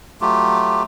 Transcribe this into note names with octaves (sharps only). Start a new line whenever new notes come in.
F#3 A3 F4 G4